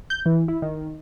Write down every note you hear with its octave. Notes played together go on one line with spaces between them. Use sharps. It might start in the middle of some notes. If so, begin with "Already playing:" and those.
G6
E3
E4
D#3